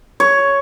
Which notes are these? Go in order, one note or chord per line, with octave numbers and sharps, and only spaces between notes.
C#5